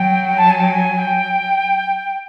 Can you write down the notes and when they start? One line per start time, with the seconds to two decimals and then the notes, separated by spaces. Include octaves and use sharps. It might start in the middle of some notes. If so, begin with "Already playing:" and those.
Already playing: F#3 G5
0.38 A5
0.50 G#5
0.60 G5
0.70 G#5
0.98 G5